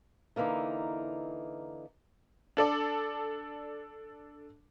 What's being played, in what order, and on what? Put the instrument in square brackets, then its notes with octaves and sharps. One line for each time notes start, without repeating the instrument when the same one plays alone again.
[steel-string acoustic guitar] D3 E3 A#3 D#4
[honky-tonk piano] D4 A4 D5